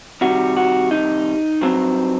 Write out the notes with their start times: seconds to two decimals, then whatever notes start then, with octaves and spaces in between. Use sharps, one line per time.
0.21 C3 D#3 G3 F#4
0.57 F#4
0.91 D#4
1.61 G2 F#3 C4